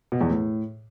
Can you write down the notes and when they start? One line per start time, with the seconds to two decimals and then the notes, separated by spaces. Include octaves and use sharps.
0.12 B2
0.21 E2
0.30 A2